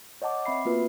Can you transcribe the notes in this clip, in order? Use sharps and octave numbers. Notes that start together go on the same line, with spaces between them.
C#5 D#5 F#5 A5 D6
C4 E5 B5 C7
A#3 B3 F4 F#4 B4